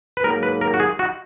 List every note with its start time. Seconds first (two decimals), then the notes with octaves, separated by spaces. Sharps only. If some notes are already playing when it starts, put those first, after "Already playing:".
0.17 B4
0.24 G#2 F#3 A#3 A#4
0.43 B4
0.61 A#4
0.74 F#4
0.80 G#4
0.99 F#4